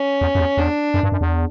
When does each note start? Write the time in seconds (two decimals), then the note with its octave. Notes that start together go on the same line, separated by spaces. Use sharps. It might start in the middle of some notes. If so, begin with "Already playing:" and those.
Already playing: C#4
0.21 E2
0.35 F#2
0.39 E2
0.57 E2 D4
0.94 F#2
1.03 G2
1.12 F#2
1.21 E2